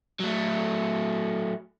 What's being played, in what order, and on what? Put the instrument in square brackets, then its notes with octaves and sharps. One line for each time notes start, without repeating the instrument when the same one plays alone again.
[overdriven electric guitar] F#3 A3